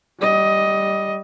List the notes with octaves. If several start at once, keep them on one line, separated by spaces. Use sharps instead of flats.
G3 D#5